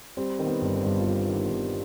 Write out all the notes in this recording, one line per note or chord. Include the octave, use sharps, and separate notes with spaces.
G3 C4
D#3 C4
B3
G1 D4
C4
G2
F4
G3 G4
D#3
G1